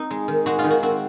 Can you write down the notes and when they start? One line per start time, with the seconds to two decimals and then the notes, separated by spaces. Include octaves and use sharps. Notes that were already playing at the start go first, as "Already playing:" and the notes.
Already playing: C4 D#4
0.11 G#3
0.28 D#3
0.46 G#3 F#4
0.59 F4
0.64 D#3
0.70 F#4
0.83 C4 F#4